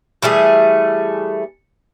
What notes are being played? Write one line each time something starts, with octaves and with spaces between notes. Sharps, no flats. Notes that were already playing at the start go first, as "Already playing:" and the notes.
E3 G3 A3 G#4